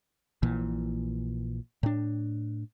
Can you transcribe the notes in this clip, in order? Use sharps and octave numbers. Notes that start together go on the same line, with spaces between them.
A#1 A#2 E3
A2 D4